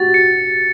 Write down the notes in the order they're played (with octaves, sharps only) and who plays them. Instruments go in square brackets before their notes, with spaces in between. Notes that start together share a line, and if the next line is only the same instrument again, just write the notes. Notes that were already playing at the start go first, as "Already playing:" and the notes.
Already playing: [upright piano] F#4 G4 [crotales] A6
[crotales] C#7